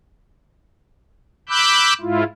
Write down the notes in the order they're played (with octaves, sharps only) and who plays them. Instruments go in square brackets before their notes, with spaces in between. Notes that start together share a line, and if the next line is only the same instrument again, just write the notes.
[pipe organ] B5 D6 E6 F#6 G6
G#2 E4 F4